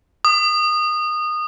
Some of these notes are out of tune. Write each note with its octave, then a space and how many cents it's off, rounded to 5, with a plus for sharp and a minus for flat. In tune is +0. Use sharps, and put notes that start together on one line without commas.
D#6 -20